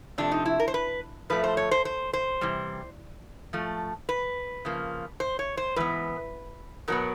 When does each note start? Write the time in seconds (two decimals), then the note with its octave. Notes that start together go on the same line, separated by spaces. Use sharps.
0.18 C3 F3 A3 D4
0.32 D#4
0.45 E4
0.60 A#4
0.68 C5
0.74 B4
1.30 A2 F3 A3 B4
1.44 C5
1.57 C#5
1.71 C5
1.85 C5
2.13 C5
2.41 C3 E3 G3
3.53 A2 F3 A3
4.09 B4
4.65 C#3 F3 A#3
5.20 C5
5.39 C#5
5.57 C5
5.76 G#2 E3 B3 B4
6.88 B2 F#3 B3 A#4